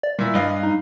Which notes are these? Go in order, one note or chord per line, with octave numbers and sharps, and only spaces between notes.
D5
A#2 G3 E4
G2 B4 D#5 F5
D#4